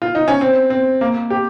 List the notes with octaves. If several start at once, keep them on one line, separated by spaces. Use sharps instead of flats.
F4
D#4
C#4
C4
C4
A#3
G4